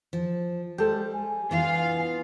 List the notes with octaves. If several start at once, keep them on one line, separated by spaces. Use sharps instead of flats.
F3
G3 G#3 G4 A4 C5
G#5
E3 B3 D4 F4 F5